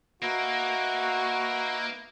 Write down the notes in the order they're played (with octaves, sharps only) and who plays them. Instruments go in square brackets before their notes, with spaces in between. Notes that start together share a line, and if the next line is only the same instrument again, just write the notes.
[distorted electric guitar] A#3 [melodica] D#4 B4 E5 [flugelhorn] F#4